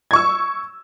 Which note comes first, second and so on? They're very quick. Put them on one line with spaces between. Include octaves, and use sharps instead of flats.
G#6 C#6 E6